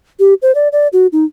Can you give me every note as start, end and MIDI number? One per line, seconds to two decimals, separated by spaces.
0.19 0.34 67
0.42 0.54 72
0.55 0.68 74
0.72 0.88 74
0.93 1.07 66
1.12 1.25 63